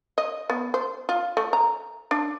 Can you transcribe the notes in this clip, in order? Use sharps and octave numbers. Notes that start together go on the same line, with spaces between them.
D#5
B3
C5
F4
A3
A#5
D4